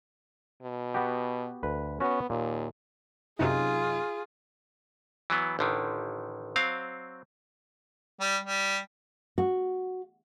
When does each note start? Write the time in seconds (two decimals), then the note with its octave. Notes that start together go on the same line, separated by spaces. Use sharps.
0.62 B2
0.94 B3 F#4 G4
1.63 D2 B4
2.00 B3 C#4 F#4 C#5
2.30 D#2 A#2
3.39 F#2 C3 D#4 F4 G#4
5.30 E3 F#3 B3
5.59 A1 D3 D#3
6.56 F#3 C4 F5
8.20 G3
8.43 G3
9.38 F#4